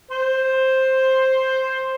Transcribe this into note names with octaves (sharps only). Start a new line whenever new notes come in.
C5 C6